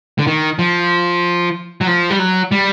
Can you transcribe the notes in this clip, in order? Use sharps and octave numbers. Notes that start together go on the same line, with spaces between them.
D3
D#3
F3
F#3
F3
G3
F#3
G3